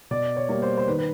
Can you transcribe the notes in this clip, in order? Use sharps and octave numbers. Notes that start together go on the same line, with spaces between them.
B2 D5
C#5
G3 A#3
C5
C5
D#3 B4
B4